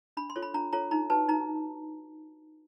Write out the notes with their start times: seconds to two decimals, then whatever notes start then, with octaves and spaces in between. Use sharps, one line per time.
0.17 D4 B5
0.30 C6
0.36 F4 A4 C#5
0.42 B5
0.54 D4 A#5
0.73 F4 A4 C#5 A#5
0.91 D#4 A#5
1.10 F#4 B4 A5
1.28 D#4 A#5